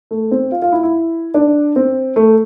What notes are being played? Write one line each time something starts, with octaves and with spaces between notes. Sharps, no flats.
A3
C4
F4
F4
E4
E4
D4
C4
A3